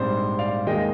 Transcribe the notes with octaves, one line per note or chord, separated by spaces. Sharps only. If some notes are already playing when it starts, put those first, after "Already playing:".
Already playing: A#1 G#2 G3 C4 C5
D5 F5
D#2 D#3 G#3 D#5 G5